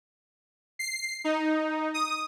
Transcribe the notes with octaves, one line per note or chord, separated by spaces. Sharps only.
C7
D#4
D#6